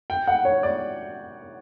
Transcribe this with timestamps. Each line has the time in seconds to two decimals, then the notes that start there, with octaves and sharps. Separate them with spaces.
0.10 G5
0.27 F#5
0.45 C#5
0.63 D5